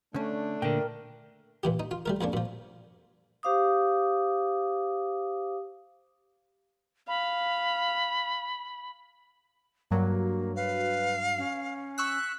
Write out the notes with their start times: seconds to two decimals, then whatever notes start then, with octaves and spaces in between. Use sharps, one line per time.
0.14 D3 A3 C#4 D4
0.62 A#2 D3 A#4 G5
1.63 A#2 E3 G4
1.80 D#4
1.91 F4
2.06 G3 A3 A#4
2.21 F2 A#3 C#4 D4
2.33 A#2 F3
3.43 G4 C5 F5 D6 D#6
7.08 F5 B5
9.91 G2 F#3 A#3
10.56 B4 F5
11.38 C#4
11.98 C#6 E6 F#6 B6